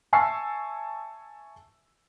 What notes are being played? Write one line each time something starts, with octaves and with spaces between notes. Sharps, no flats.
E5 G#5 A5 C#6 E6 C7